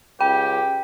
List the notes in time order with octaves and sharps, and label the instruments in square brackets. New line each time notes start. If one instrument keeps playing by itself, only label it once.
[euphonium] C#2 [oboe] G4 [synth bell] G5